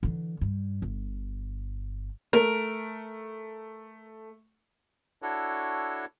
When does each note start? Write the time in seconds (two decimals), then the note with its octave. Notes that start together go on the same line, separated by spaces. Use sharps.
0.03 D3 E3
0.41 G2
0.82 G1
2.33 A3 A#4
5.22 D4 E4 F#4 A4 C#5